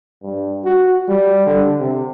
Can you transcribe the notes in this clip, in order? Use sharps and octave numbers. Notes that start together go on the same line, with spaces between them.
G2
F#4
G3
D3
C3